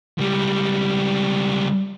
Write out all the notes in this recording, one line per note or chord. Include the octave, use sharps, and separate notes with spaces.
C#2 G3